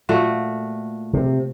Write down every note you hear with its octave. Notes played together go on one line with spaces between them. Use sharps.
A#2 A3 F#4
C3